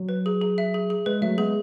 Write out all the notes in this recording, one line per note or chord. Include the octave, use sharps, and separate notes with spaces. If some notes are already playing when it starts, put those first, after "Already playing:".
Already playing: F#3
B4
G#4
G#4
E5
G#4
G#4
G#3 B4
F#3 A3 E5
G#3 B3 G#4